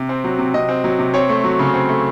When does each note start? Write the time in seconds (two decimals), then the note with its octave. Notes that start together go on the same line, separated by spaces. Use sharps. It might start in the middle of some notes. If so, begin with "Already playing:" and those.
Already playing: C3
0.09 C4
0.24 F#3
0.38 C3
0.54 C3 D#5
0.69 C4
0.84 F#3
0.99 C3
1.14 C4 C#5
1.29 A3
1.44 F#3
1.59 C#3
1.74 C4
1.89 A3